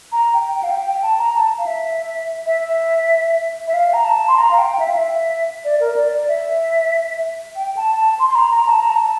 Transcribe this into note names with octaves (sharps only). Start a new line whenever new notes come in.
A#5
G5
G5
F5
G5
G5
A5
A#5
A5
F5
E5
E5
E5
F5
A#5
A5
C6
A#5
F5
G5
E5
F5
E5
D5
A#4
D5
D5
E5
G5
A5
A5
C6
C6
A#5
A#5
A5
A#5
A5